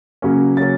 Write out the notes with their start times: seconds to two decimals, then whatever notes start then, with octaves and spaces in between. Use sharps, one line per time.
0.22 C#3 F#3 A#3 C#4
0.57 C#3 F#3 A#3 C#4 A6